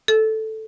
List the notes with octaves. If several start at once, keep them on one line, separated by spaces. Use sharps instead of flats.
A4